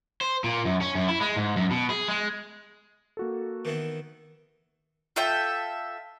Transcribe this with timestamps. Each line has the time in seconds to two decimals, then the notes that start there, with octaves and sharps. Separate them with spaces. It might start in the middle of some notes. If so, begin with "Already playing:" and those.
0.21 C5
0.44 A#2
0.65 F#2
0.81 C#4
0.95 F#2
1.08 E4
1.21 G#3
1.37 G#2
1.56 F#2
1.71 B2
1.90 G#4
2.08 G#3
3.17 A#3 F#4 A4
3.65 D#3 E3 B3
5.16 F4 A4 E5 G5